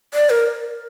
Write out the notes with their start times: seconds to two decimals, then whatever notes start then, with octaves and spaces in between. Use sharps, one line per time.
0.14 D5
0.30 A#4